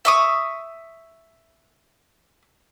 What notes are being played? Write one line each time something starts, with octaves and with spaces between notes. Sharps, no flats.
E5 C#6 D#6